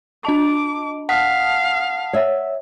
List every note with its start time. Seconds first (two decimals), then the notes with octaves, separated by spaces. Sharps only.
0.25 D4 D#5 A5 D6
1.09 F5 F#5 A5 D#6 F6 B6
2.13 C#5 D5 E5